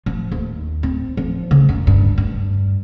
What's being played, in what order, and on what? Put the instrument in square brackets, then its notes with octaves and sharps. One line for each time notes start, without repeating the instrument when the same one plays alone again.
[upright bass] F3
D#2
C4
F3
C#3
F#2
G2
G2